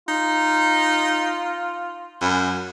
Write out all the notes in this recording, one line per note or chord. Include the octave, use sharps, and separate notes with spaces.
D#4 F4
F#2